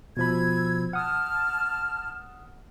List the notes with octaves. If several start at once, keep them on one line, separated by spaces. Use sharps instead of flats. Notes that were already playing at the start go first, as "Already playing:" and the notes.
B2 F3 B5 E6 G#6
F#5 A5 D#6 F6